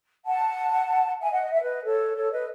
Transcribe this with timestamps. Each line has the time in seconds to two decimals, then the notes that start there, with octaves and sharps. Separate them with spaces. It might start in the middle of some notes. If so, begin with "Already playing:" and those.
0.25 F#5 A5
1.20 E5 G#5
1.31 D#5 F#5
1.42 D#5
1.51 E5
1.60 B4 D#5
1.84 A4 C#5
2.16 A4 C#5
2.32 B4 D#5